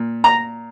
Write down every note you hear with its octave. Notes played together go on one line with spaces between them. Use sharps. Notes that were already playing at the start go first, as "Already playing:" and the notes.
Already playing: A#2
A#5